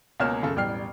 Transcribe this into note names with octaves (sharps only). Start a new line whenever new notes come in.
C#2 B2 A#3 C#5 F6 E7
F#2 C#3 A4
E1 A1 G3 G5 F6 C7